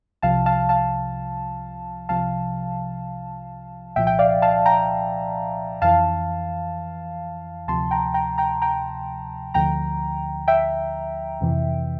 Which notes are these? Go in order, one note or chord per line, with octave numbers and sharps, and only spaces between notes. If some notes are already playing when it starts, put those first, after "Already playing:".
C2 C3 F3 F5 A5
F5 A5
F5 A5
C2 C3 F3 F5 A5
C2 A#2 F3 E5 G5
G5
D5 F5
F5 A5
G5 A#5
F2 E3 F5 A5
D2 C3 F3 A5 C6
G5 A#5
G5 A#5
G5 A#5
G5 A#5
D2 D3 F3 G5 A#5
E5 G5
F2 C3 E3